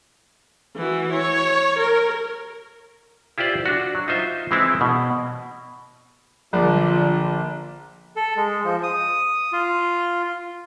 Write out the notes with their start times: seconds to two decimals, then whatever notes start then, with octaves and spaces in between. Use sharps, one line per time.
0.76 E3 F#4
1.13 C#5
1.79 A#4
3.38 E4 F4 G4 C5 D5
3.66 D4 F#4
3.95 F#3
4.08 D#4 F4 C5 E5
4.51 E3 G#3 C4 D#4 E4
4.81 B2
6.53 A#1 D3 F3 D5
8.16 A4
8.36 G#3
8.65 F3
8.83 D#6
9.52 F4